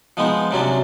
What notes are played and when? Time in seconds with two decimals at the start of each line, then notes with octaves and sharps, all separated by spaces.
0.17 F3 G#3 B3 D#4
0.51 C3 F#3 C#4 D4